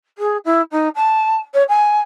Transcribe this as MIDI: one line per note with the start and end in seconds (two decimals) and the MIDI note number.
0.18 0.37 68
0.45 0.61 64
0.71 0.88 63
0.95 1.37 81
1.54 1.63 73
1.69 1.99 80